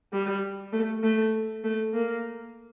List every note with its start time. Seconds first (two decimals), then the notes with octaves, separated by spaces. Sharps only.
0.13 G3
0.73 A3
1.03 A3
1.64 A3
1.94 A#3